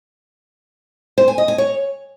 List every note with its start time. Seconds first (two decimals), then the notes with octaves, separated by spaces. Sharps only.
1.18 C5
1.28 G#5
1.38 D#5
1.48 G#5
1.58 C#5